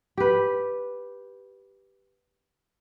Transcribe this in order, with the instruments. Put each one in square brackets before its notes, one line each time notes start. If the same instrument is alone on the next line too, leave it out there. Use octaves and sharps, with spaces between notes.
[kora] G4 B4